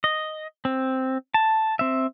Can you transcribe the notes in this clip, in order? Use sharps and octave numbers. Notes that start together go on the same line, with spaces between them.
D#5
C4
A5
C4 E5